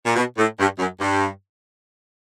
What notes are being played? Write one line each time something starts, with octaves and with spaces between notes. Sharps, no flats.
A#2
B2
A2
G2
F#2
G2